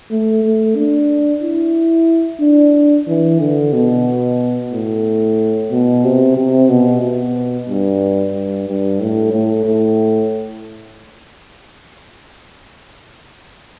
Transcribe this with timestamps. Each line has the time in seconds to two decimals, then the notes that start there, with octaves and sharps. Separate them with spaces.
0.11 A3
0.43 A3
0.76 D4
1.43 E4
2.41 D4
3.07 E3
3.40 D3
3.73 B2
4.72 A2
5.71 B2
6.04 C3
6.37 C3
6.69 B2
7.02 B2
7.69 G2
8.34 G2
8.67 G2
9.00 A2
9.33 A2
9.66 A2